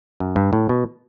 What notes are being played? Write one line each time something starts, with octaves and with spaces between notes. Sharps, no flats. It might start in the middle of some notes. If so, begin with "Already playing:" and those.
F#2
G2
A2
B2